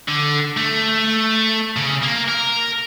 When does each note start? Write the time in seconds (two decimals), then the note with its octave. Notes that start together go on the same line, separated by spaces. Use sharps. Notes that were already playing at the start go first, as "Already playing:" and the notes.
0.09 D3
0.57 A3
1.76 C#3
2.02 A#3
2.28 A#4